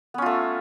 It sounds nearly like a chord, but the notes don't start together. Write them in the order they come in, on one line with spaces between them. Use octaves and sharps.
B3 C#4 F4 A3